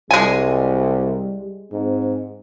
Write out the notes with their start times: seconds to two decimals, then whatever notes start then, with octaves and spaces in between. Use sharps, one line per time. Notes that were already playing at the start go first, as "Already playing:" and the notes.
0.11 C2 G3 G#3 G#5
1.72 G#2 C4